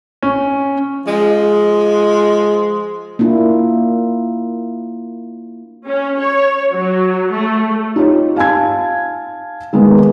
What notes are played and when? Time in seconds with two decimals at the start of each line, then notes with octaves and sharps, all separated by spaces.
0.23 C#4
1.06 F3 G#3
3.19 A#3 D4 E4 F4
5.86 C#4
6.19 C#5
6.72 F#3
7.32 A3
7.96 D#4 F4 G4 C#5
8.37 F5 G#5 A5 G#6
9.73 D#3 G#3 A#3 B3